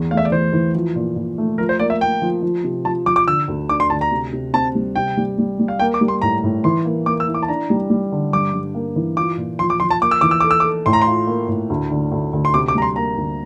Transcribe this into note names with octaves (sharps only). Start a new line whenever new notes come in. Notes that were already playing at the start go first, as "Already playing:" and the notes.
Already playing: E2
A3 F5
E5
D5
E3 C5
E3
F3
A#2
A#2
A3
F3 A#4
C5
A#3 D5
E5
A#3 G5
F3
F3
C3
F3 A5
F3 D6
D6
D3 E6
D2
D4 D6
C6
D2 A5
A#5
C3
C3
C4 A5
G3
C3 G5
G3
G3
G3
F5
A#3 G5
D6
G3
C6
A2 A#5
A2
E3 C6
A#3
A#3 D6
E6
E4
D6
A5
D4 A#5
G3
G3
D3
G2 D6
G2
A#3
E3
F4 D6
A#2
F3 C6
D6
F3 C6
A5
A#3 D6
E6
E3 D6
E6
A4 D6
E6
D6
A4
A2 C6
A#5
C6
F4
A#3
A2
D2
D3
D2
D2
C6
C3 D6
D6
G3 A#5
C6
A#3 A#5
D2